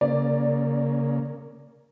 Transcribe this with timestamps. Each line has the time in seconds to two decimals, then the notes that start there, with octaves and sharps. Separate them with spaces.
0.01 C#3 A#3 D5